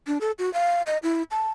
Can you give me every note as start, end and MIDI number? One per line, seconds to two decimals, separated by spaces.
0.07 0.18 62
0.21 0.32 69
0.39 0.52 66
0.54 0.82 77
0.87 0.98 75
1.03 1.23 64
1.31 1.50 81